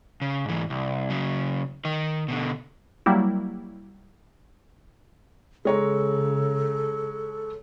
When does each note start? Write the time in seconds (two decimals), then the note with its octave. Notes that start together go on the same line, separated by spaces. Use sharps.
0.21 C#3
0.45 G#2 E3
0.70 C2
1.10 C#3 F#3
1.85 D#3 D#4
2.28 B2 D3
3.06 F#3 G3 A#3 E4
5.65 C#3 G#3 A4 C#5 A#5